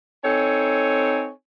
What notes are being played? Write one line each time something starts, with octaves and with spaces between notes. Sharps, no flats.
C4 D#4 A4 C#5 G#5